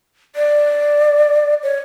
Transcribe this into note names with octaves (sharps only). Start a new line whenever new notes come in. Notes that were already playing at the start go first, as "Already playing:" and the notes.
D5
C#5